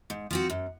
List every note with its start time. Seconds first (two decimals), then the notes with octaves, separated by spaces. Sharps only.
0.10 G#2
0.31 F3 C4 F#4
0.50 F#2